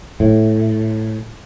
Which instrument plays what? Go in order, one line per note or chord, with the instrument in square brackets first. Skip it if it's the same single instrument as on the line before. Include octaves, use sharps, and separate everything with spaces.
[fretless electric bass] A2